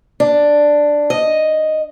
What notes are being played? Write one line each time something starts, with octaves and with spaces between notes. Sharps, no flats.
D4
D#5